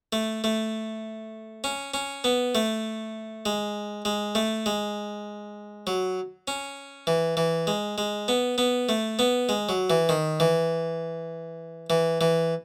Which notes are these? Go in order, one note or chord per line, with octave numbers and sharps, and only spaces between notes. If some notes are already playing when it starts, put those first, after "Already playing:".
A3
A3
C#4
C#4
B3
A3
G#3
G#3
A3
G#3
F#3
C#4
E3
E3
G#3
G#3
B3
B3
A3
B3
G#3
F#3
E3
D#3
E3
E3
E3